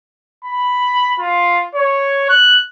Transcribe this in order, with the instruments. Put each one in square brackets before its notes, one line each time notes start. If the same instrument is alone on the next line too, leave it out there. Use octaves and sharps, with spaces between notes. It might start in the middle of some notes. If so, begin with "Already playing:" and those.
[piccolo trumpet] B5
F4
C#5
F#6